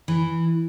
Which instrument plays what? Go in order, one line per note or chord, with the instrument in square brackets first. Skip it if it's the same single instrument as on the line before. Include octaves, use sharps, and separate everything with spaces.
[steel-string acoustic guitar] E3